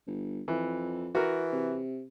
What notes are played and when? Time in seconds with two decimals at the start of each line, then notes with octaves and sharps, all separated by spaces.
0.07 G1
0.48 F2 E3
1.15 E3 F#4 A#4
1.53 C3